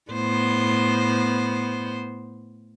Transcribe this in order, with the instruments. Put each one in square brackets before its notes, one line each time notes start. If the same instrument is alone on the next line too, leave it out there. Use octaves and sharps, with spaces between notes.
[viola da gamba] A2 B3 C5